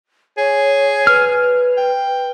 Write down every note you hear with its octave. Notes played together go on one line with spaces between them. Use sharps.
G#4 C#5
B4 F6
G5